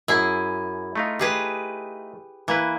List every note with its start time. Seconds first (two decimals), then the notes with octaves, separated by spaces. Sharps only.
0.08 F#2 E4 G#4
0.96 A3 D#4 F4
1.19 G4 G#4 B4
2.48 E3 A#3 B4